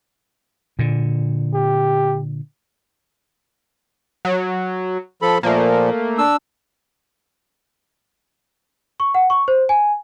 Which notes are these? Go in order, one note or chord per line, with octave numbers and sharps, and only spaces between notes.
A#2 D3
G4
F#3
F3 A4 B5
A#2 F3 A3 A#3
D4 E6
C#6
F#5
C#6
C5
G#5